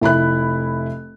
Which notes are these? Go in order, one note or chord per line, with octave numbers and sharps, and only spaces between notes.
F1 E4 B5 F#6